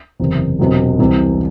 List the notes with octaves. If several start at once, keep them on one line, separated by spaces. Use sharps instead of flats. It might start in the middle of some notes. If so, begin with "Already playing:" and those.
F#1 E2 C3
E1 E2 C3 F#3
C2 C3 E3